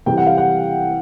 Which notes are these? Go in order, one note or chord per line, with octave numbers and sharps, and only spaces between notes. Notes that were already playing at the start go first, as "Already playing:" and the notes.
C3 E3 G3 G5
F#5
F5
F#5